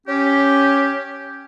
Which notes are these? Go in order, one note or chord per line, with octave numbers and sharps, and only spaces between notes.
C#4 G4